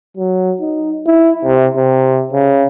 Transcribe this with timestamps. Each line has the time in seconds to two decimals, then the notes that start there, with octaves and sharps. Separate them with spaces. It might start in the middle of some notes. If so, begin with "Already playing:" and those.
0.17 F#3
0.60 D#4
1.06 E4
1.45 C3
1.76 C3
2.33 C#3